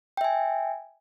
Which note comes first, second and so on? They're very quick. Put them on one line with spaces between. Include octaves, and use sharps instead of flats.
G5 E5 G#5